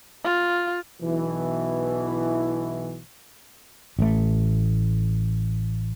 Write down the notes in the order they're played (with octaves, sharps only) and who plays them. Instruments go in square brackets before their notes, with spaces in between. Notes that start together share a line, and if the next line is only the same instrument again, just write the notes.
[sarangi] F4
[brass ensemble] B1 B2 E3
[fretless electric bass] A1 A3